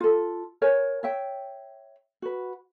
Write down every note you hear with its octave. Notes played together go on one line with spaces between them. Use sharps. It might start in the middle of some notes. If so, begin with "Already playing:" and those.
F4 A4
A#4 C#5 G#5
C#5 E5 G5
F#4 B4